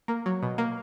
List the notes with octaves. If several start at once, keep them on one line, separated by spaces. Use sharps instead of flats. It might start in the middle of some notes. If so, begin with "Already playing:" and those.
A#3
F#3
B2
A#3